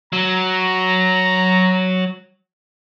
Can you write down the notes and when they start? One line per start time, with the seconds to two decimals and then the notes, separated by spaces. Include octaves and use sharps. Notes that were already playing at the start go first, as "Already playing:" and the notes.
0.13 F#3 A#5